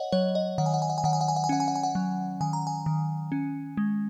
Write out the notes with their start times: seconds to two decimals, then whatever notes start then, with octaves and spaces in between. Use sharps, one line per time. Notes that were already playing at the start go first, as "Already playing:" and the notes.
Already playing: C#5 D#5 F#5
0.12 F#3 C#5
0.35 D#5
0.58 D#3 F#5
0.66 G#5
0.74 F#5
0.82 G#5
0.90 F#5
0.98 G#5
1.04 D#3 F#5
1.13 G#5
1.21 F#5
1.28 G#5
1.36 F#5
1.44 G#5
1.49 C#4 F#5
1.60 G#5
1.68 F#5
1.76 G#5
1.83 F#5
1.95 F#3
2.41 D#3 G#5
2.53 A#5
2.67 G#5
2.86 D#3
3.32 C#4
3.77 G#3